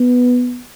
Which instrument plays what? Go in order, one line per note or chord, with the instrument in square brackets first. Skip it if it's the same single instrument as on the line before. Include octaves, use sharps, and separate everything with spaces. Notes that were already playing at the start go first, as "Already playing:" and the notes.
Already playing: [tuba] B3